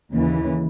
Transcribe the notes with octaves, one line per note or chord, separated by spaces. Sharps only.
D#2 C#3 E3